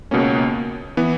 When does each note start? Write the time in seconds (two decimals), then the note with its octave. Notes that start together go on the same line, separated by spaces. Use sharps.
0.11 C#2 B2 A#3 C#4
0.97 E3 B3